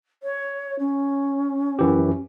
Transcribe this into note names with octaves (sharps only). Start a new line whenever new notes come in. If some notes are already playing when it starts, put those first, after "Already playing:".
C#5
C#4
F#2 E3 G4